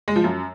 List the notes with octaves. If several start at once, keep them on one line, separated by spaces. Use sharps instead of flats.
G#3
F3
F#2